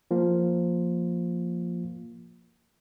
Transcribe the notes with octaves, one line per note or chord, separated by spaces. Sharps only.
F3 A#3 F4